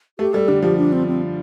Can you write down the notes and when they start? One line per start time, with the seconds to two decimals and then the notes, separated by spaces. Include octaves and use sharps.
0.19 A3 G4
0.33 G3 A4
0.48 D3 G4
0.62 F3 G4
0.78 D4
0.92 C4
1.08 C4